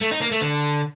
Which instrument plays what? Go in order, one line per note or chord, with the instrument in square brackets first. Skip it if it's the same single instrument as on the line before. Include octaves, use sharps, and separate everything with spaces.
[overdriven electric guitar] A3
D#4
A#3
A3
D3